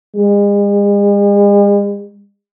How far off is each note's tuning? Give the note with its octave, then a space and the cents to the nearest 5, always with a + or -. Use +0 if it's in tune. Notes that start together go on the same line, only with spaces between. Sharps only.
G#3 -45